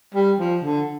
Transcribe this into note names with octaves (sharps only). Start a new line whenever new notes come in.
G3
F3
D3